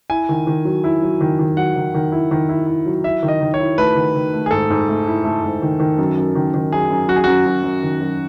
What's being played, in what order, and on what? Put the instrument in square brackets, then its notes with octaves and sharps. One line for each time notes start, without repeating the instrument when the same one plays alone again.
[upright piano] E4 [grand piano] G#5
[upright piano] D#3
D#3
F#3
E4
F#3
D#3
D#3
[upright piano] F#3 [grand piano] F#5
[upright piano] D#3
D#3
E4
D#3
E4
E4
F#3
[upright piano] E4 [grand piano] E5
[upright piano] D#3
[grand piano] D#5
[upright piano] D#3
[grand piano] C#5
[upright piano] E4
[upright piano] A3 [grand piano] B4
[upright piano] D#3
D#3
A3
[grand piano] G#4
[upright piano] G#2 [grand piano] A4
[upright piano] G#2
A3
E4
A3
G#2
D#3
D#3
F#2
F#2
D#3
D#3
[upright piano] F#2 [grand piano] G#4
[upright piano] F#2
[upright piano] F#2 [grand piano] F#4
[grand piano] G#4
[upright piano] F#2 [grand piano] F#4
[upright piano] F#2
F#2
D#3
F#2